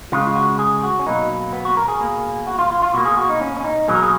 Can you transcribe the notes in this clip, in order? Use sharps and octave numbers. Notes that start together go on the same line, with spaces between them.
C#3 G#3 F4
F4
F#4
G#4
F#4
C#4
B2 F#3 A#3 D#4
B3
F#4
A#4
G#4
B2 A#3
F#4
F4
F4
F4
B2 A#3 F#4
G#4
F#4
D#4
C#4
C#4
D#4
B2 F#3 A#3 G#4
A#4
G#4